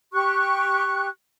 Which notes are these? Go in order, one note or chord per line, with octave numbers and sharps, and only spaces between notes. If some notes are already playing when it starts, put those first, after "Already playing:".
G4 C#6 F#6